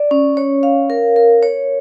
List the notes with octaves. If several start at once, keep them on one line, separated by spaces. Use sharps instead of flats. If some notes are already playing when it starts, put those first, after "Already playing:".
Already playing: D5
C#4
C#5
F5
A#4
A#4
C#5